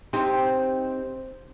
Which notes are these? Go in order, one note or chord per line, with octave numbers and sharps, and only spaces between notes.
C4 D#4 G4